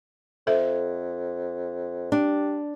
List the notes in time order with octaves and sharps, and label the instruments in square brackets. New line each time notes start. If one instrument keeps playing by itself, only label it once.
[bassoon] F2 [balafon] A4 C5 E5
[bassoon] G3 [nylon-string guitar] D4